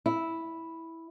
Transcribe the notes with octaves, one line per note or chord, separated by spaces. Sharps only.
E4